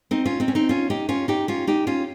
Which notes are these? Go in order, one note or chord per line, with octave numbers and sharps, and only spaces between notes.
C4 D#4
C#4 F4
C4 D#4
C#4
C4 D#4
C#4 F4
D#4 G4
C#4 F4
D#4 G4
C#4 F4
D#4 G4
C#4 F4